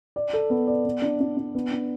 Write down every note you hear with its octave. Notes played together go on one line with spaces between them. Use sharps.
D5
A4
B3
D5
B3
D4
D4
D4
B3
D4